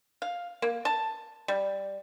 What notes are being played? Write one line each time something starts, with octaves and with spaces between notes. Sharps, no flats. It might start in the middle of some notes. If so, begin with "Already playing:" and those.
F5
A#3
A5
G3